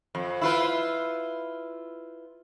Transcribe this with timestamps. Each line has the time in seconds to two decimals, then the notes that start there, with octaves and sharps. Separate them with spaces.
0.15 F2
0.41 E4 F4 B4